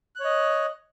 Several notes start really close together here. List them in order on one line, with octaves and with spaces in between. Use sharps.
F#6 C#5 D#5